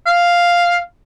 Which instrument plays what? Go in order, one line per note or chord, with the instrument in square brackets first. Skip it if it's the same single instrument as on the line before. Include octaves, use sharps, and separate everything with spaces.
[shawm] F5